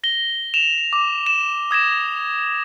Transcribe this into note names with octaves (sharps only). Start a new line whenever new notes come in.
A#6 G7
E7 F7
D6
E7
D#6 G#6 A#6 E7